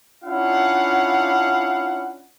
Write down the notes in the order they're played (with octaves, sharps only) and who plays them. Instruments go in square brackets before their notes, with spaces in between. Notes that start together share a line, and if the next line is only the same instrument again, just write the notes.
[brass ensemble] C#4 D4 E4 F4 F5 F#5